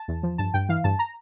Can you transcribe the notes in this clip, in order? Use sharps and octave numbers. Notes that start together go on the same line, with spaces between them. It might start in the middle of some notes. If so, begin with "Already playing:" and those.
Already playing: A5
E2
F3
G2 A5
G2 G5
E3 F5
G2 A5
A#5